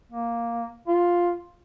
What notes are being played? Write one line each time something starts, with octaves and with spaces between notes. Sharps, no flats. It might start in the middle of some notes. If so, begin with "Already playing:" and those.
A#3
F4